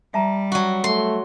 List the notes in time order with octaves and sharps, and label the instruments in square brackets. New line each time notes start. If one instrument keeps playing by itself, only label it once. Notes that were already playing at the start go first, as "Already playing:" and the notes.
[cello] G3 [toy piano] E5 A5 A#5
[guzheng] F#3 F#4
[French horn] A3 [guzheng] C6